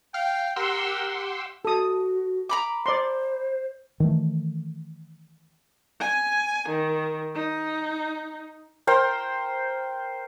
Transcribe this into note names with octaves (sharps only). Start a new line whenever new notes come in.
F5 G5
G4 A#4 F#5 C6 E6
F#4 A4 D#6
A#5 B5 D6
C5 D5 C6
D#3 E3 A3
G#5
D#3
D#4
A#4 C5 G5 A#5